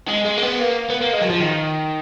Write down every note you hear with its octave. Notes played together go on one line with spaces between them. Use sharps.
G#3
G#3
A#3
B3
A#3
B3
A#3
G#3
F#3
F3
D#3